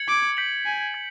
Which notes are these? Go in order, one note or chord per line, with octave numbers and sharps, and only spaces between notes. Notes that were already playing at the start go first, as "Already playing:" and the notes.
Already playing: G#6 C#7 F#7
D6
G6 B6 D7 F#7
G#5
G#6